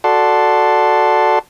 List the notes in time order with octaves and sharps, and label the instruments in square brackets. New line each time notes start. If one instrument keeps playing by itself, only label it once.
[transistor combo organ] F#4 A4 D5 F#5 A5 C6